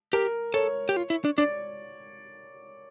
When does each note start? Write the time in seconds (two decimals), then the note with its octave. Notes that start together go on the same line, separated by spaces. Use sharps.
0.13 G4 A#4
0.54 A4 C#5
0.89 G4
0.97 F4
1.10 E4
1.25 D4
1.38 D4 D5